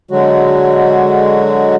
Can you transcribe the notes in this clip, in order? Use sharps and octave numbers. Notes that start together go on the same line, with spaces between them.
D3 F#3 G#3 F#4